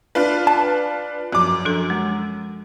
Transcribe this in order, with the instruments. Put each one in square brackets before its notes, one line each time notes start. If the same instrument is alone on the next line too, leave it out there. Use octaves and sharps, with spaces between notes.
[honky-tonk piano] D4 F4 B4
[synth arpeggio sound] A5
[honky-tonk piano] F#2 D6 [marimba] F3
[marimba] F3 D4 A4
G#3